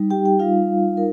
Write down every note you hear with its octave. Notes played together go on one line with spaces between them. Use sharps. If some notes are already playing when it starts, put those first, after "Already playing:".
Already playing: G3 D#4
G4 G5
G4 G5
G3 D#4 F4 F5
D#4 A#4